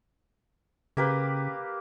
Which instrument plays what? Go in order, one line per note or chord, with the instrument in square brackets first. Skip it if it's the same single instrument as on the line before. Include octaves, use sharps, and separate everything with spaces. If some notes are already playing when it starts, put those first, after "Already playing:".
[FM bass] C#3 [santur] A#3 G4 B4